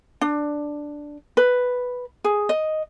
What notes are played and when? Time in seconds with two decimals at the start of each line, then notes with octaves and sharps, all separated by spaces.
0.21 D4
1.37 B4
2.24 G#4
2.49 D#5